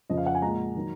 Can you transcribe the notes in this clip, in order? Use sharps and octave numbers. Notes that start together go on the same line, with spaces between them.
F2 C#3 F3 D#5
F5
F#5
G#5
A#2 G#3 A#5
D#3 F#3